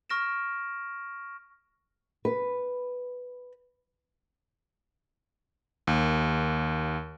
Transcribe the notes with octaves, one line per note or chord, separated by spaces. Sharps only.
C#6 F6 A#6 D7 E7
B4
D#2